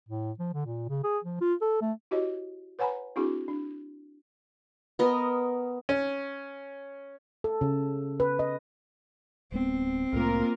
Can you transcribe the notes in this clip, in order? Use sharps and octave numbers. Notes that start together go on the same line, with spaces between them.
A2
F3
D3
A#2
C#3
G#4
F3
F4
A4
A3
E4 F#4 G4 C#5 D#5
B4 C#5 F#5 G#5 A#5 B5
C4 D4 E4 F#4 G#4
D4
B3 A#4 D#5
C#4
A4
C#3
B4
D#5
D1 G#3 B3 C4
C2 A2 A3 A#3 F4 A#4